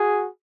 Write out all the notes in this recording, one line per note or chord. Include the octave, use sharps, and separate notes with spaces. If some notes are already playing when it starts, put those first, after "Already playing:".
Already playing: F#4 G#4